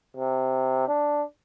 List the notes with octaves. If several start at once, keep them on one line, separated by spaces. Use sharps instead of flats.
C3
D4